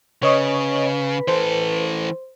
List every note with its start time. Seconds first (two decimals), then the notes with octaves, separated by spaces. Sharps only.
0.23 C#3 B4 C#5 D#5 C#6
1.28 E3 A4 C5